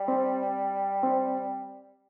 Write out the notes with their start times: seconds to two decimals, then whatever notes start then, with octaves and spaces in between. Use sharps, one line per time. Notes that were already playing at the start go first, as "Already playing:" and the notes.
Already playing: G3
0.08 C4
1.03 C4